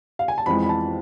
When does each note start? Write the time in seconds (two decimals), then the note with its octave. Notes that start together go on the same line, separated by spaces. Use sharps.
0.19 F5
0.28 G#5
0.38 A5
0.46 F2 E3 G#3 B5
0.63 B5
0.69 A5